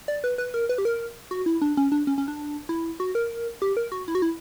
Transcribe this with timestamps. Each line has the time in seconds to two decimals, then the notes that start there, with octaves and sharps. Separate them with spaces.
0.08 D5
0.24 B4
0.38 B4
0.54 A#4
0.69 B4
0.78 G4
0.85 A#4
1.31 F#4
1.46 E4
1.62 D4
1.77 C#4
1.92 D4
2.07 C#4
2.18 C#4
2.28 D4
2.69 E4
3.00 F#4
3.15 A#4
3.62 G4
3.77 A#4
3.92 F#4
4.08 E4
4.15 F#4
4.22 E4